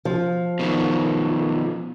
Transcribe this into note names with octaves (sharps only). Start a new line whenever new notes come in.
F3
B2 D#3